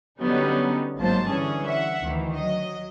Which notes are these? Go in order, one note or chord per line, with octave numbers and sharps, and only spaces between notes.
D3 F#3 G3 B3 C#4 D#4
G1 G#2 F#3 A#3 C5 A5
D3 E3 G3 C#4 G#4
E5 F#5
D2 D#3 E3
F#3 D#5